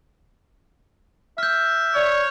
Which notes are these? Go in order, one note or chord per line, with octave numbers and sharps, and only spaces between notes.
E5 F6 G6
C#5 D5